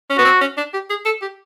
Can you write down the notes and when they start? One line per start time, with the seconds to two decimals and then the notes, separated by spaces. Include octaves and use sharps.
0.10 C#4
0.18 B3 F#4
0.25 C4
0.41 C#4
0.57 D4
0.74 G4
0.90 G#4
1.05 A4
1.22 G4